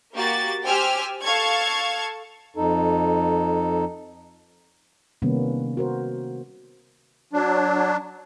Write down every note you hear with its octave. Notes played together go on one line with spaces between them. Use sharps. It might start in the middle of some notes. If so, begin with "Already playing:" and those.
A#3 F#4 G4 A6
G4 C5 G5 G#5 E6 F6
A4 F5 A5 C#6 G#6
F2 D#4 A4
C3 D#3 G3 A#3 B3 C#4
F#4 A#4 C5
F#3 D4